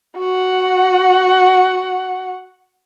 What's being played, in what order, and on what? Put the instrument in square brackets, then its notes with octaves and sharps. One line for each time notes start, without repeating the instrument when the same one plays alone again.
[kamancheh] F#4 F#5